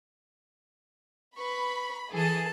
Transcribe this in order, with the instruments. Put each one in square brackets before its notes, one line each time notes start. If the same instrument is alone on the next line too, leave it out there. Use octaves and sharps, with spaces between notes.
[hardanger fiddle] B4 C#6 [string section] B5
[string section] E3 G#4 [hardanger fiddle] A4 A5